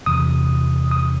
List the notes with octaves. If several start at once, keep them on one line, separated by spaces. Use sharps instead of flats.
E2 C3 E3 D#6
D#6